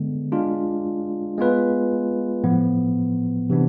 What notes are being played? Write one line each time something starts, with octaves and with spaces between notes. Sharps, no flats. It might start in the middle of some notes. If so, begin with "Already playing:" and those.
Already playing: D3 G#3 B3
G#3 D4 F4
G#3 B3 F4 B4
A2 F3 B3
C3 E3 B3 D4